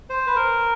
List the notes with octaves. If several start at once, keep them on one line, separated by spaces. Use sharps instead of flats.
C5
B4
A#4